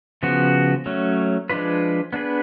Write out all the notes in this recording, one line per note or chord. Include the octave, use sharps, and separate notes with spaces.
C#3 F3 B3 F#4
F#3 A3 C#4
F3 G#3 D4 F4 B4
B3 D4 G#4 B4